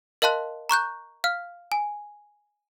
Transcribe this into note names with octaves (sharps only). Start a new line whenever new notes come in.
A#4 D#5 F5 A5 C6 F#6
A#5 C#6 F#6 G6
F5 F6
G#5